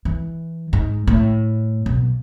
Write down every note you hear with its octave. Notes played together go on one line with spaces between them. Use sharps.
E3
G#2
A2
B1